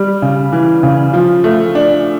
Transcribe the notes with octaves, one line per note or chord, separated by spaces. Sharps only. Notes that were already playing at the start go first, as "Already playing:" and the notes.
Already playing: G3
C#3
E3
C#3
F3
A3
D4